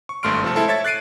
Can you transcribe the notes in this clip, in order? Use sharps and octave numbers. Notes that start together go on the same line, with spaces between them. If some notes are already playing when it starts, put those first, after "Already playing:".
C#6
G#1 G2 A3 C6 F6 D7
C3 F3 A3 C4 A4
G#3 E4 A4 C5
C#5 E5 G#6 A6
F#6 A6 C7 D7 D#7